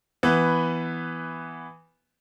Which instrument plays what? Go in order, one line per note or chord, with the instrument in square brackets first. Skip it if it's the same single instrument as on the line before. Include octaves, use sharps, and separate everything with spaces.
[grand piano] E3 B3